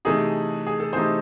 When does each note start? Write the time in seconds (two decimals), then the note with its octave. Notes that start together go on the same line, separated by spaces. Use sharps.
0.05 C3 E3 A3 D#4 G#4
0.67 G#4
0.80 A4
0.93 C3 E3 A3 D#4 G#4 C5